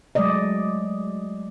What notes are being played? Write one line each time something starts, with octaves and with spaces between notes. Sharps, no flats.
F#3 G#3 A3 D5 D#5